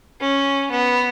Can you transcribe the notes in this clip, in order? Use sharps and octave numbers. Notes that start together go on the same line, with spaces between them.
C#4
B3